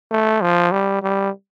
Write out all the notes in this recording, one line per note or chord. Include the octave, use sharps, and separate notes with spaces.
A3
F3
G3
G3